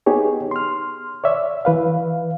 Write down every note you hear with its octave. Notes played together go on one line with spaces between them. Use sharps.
B3 D#4 G4 G#4 C#5
C6 F6
C#5 D5 E5
E3 B4 F5